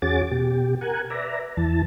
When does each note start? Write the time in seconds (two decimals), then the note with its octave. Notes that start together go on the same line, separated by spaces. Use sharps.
0.02 E2 C#4 F#4 G#4 D6 A6
0.31 B2 G4
0.81 A#4 F#5 G#5
1.10 B4 D5 E5 A#5
1.57 E2 E3 A5